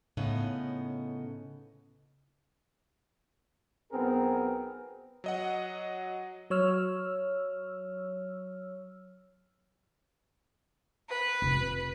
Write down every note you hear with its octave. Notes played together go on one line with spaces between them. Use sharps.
A2 C#3 B3 D#4
B1 B3 C4 G#4 A#4
F#3 D#5 F#5
F#3 C#5 E6 F6
B4
F1